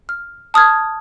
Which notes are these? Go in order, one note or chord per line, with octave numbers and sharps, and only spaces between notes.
F6
A5 D#6 F6 G#6